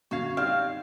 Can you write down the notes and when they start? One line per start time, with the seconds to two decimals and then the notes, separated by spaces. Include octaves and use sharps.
0.11 F#2 D3 F#4 F5 G#6
0.37 G3 C4 D#4 D5 F5